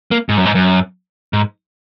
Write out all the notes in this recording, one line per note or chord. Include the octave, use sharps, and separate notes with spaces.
A#3
G#2
F#2
G#2
F#2
G#2